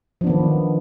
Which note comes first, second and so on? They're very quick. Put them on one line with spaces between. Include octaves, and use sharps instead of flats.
F3 D4 B3 D#3